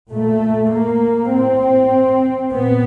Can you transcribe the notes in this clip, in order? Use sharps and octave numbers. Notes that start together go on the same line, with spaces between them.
A#2 A3
A#3
A2 C4
A#2 B3